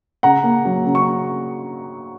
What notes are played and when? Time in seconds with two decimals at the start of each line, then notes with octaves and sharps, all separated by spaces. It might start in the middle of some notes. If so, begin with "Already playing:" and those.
0.23 C#3 F#5 A#5
0.43 A#3
0.65 F#3
0.86 C#3
0.95 C#6